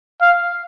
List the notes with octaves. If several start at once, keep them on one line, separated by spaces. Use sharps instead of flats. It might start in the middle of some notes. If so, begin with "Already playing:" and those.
F5